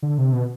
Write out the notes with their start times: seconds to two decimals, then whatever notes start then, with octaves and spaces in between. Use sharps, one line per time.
0.02 D3
0.18 C3
0.33 B2